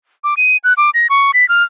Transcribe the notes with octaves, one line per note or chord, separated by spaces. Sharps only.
D6
D#7
F#6
D6
A#6
C#6
B6
F6